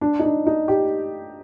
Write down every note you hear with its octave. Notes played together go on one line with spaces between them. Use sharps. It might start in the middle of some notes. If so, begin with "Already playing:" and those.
D4
D#4
D4
D#4
G4